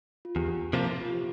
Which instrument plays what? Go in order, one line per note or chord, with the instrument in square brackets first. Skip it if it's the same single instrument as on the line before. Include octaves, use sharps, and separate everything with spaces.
[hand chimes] F4
[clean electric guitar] E2 [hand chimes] G4
[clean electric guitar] C3 F3 A#3 F4
[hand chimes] F4
G4